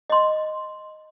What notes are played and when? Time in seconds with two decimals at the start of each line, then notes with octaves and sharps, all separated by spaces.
0.10 D#5 C6